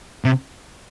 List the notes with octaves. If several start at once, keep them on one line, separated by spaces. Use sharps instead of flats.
C3